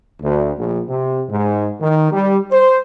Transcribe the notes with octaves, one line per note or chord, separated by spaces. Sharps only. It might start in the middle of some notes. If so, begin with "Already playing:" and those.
D2
A#1
C3
G#2
D#3
G3
C5